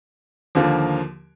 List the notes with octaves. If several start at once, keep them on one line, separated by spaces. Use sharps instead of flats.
D#2 D3 F3 A#3